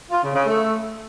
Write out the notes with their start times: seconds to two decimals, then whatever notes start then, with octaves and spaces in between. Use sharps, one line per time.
0.11 F4
0.23 C#3
0.34 C#3
0.46 A3